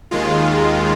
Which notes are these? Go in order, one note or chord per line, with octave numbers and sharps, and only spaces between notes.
D#2 D#3 G#3 F4